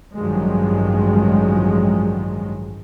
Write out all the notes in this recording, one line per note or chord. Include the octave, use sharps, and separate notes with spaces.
A1 G2 D#3 F3 F#3 G#3